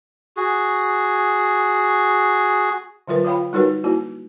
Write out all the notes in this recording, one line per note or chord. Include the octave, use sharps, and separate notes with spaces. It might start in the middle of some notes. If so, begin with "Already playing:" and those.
F#4 G#4
D3 F#3 F4 A#4 B4
F4 C#5 F5 G5 B5
G3 D#4 F#4 A#4 B4 C#5
A#3 E4 F#4